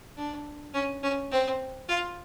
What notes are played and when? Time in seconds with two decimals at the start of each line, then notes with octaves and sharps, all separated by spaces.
0.17 D4
0.74 C#4
1.03 C#4
1.32 C4
1.88 F4